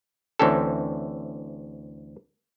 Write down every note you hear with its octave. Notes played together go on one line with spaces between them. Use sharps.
D2 E3 C4 C#4 A4